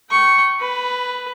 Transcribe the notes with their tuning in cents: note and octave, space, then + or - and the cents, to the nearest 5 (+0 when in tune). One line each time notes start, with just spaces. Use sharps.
G5 -25 C#6 +0
B4 +10 B5 -15